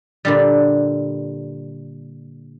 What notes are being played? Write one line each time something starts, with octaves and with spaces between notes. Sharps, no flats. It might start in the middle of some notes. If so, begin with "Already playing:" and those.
A#2 D3 G3